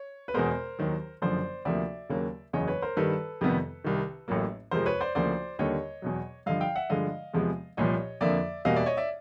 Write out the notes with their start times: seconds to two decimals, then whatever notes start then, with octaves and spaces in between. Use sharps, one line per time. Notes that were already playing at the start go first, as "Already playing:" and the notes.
Already playing: C#5
0.28 B4
0.34 E2 B2 G#3 B3 A#4 C5
0.79 D#2 D#3 F#3
1.22 F#1 F#2 D3 F3 C5 D5
1.65 D2 C3 F3 A#3 D5 E5
2.09 D#2 C#3 F#3 A#3
2.53 F#1 E2 C#3 E3 C#5 D#5
2.68 B4 C#5
2.82 A#4 C5
2.97 G2 D#3 G3 A4 B4
3.41 F2 C3 D#3 G3 B3
3.84 C2 C3 D#3
4.28 A1 A2 F#3 A#3
4.71 F2 C3 F3 G#3 A#4 C5
4.86 B4 C#5
5.00 C5 D5
5.15 D2 C#3 F3 A#3 C5 D5
5.59 D#2 D3 G3 A#3 C#5 D#5
6.02 E2 B2 F#3
6.46 G2 D3 F3 D#5 F5
6.61 F5 G5
6.76 E5 F#5
6.90 G2 D3 F3 G#3 D#5 F5
7.34 E2 C3 F3 G#3 B3
7.77 C2 A#2 F3 C#5 D#5
8.21 F2 D3 F3 A#3 D5 E5
8.65 E2 B2 G3 A#3 D#5 F5
8.75 D5 E5
8.86 C#5 D#5
8.97 D5 E5